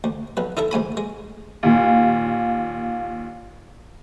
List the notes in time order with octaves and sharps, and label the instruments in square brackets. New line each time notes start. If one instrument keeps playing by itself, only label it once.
[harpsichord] D2
B1 B4
D#4 E4 A4 E5
D2 G#2 G#5 B5
G#3
[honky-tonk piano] D#2 A#2